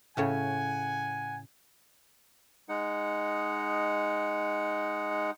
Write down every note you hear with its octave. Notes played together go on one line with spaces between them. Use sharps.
A2 C#3 C#5 F#5 G#5
G#3 D#4 F#5